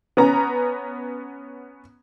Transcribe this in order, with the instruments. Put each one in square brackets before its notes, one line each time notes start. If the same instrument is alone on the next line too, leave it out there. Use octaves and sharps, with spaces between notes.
[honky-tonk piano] B3 C#4 A#5